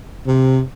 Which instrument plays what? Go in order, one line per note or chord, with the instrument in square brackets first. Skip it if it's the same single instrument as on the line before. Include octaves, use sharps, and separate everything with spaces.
[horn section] C3